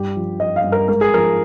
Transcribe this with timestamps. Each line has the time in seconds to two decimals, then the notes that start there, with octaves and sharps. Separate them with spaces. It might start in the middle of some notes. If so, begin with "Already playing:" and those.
Already playing: G2 G4
0.16 F3
0.40 F3 D#5
0.56 F5
0.64 G2
0.72 A#4
0.88 G#2 A#4
1.01 G#4
1.13 F3 A#4